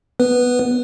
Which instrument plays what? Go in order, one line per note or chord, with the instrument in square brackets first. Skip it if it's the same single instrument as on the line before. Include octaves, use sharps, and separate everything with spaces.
[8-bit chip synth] B3 B4